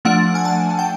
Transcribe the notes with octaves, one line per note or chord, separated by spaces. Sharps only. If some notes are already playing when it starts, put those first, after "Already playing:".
F3 A3 D4 F#5
G#5
A5
G5